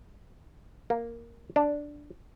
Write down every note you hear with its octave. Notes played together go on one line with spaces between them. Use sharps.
A#3
D4